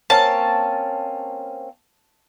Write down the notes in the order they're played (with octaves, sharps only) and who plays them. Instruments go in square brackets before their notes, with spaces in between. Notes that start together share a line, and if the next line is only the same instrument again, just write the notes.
[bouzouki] A#3 C4 C#4 [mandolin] A5